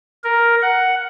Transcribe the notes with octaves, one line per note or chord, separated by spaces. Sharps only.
A#4
F#5